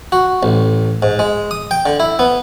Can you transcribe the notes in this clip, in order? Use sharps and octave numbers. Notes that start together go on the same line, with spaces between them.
F#4
A1
G#2
G#3
D#6
G5
D3
E4
B3